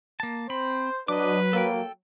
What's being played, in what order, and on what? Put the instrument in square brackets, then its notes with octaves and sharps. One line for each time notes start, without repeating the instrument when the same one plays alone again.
[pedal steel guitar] A#3 A5
[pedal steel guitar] C4 B5 [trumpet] C5
[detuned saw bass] F#3 [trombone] D4 [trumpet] B4 [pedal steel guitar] D#5 D6
[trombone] A#3 [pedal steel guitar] A4 G5